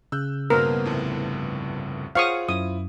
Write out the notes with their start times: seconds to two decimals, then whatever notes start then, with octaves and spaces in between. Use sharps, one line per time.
0.12 C#3 E6 F#6 G6
0.50 G2 B2 A#3 B3 A#4 C5
0.85 C2 F2 A2
2.15 F4 G#4 C5 C#5 F5 F#5 C#6 D#6
2.49 F#2 E4 D#6